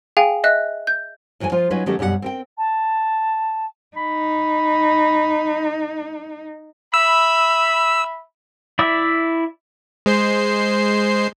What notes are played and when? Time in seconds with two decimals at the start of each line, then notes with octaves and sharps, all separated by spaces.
0.17 G#4 F5 G5 G#5
0.44 D#5 E5 F#6
0.87 G6
1.40 F2 E3 F#3 G5 G#5
1.52 F3 F4
1.70 F#3 C#4 D#4 F4 B4
1.86 D#3 F#3 A3 C#4 G4 A#4
1.99 F#2 B2 G3 G4 F#5
2.22 C4 A#4 G5
2.58 A5
3.97 D#4 B5
6.94 E5 B5 E6
8.79 E4 D5 E5
10.06 G#3 C5 C7